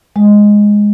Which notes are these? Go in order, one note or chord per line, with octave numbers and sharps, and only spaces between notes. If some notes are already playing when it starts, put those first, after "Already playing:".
G#3